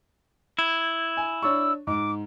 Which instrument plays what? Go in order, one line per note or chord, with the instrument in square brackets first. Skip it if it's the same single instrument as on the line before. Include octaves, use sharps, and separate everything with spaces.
[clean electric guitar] E4 [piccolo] G#6
[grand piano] G#5
[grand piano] D4 C#5 C#6 [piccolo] E6
[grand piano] G#2 [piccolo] D6